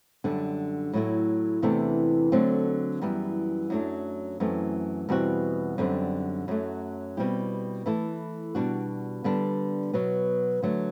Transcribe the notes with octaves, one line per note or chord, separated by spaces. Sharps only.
F#2 D3 G3 D4
A2 F#3 A3 E4
E2 C3 E3 A3 D4
D3 F#3 A3 C4 F#4
F#2 E3 G3 B3
F#2 F#3 A3 D4
F#2 E3 A3 C4
E2 B2 G3 C4 F#4
F#2 D3 G3 C4
F#2 F#3 A3
B2 G3 C4 E4 G4
E3 A3 E4 A4
B2 G3 D4 F#4
D3 G3 B3 D4
B2 F#3 B3
D3 F#3 A3